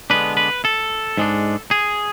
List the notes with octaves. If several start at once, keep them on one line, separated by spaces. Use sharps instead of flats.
D3 G#3 B3 D4 B4
B4
A4
G#2 G#3 D4
G#4